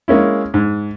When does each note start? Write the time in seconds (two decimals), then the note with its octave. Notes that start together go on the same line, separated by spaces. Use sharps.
0.08 G#3 A#3 C#4 E4
0.54 G#2